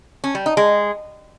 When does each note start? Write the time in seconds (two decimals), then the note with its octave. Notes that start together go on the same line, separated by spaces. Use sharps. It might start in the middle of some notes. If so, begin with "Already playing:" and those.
0.24 C#4
0.35 G3
0.46 D#4
0.57 G#3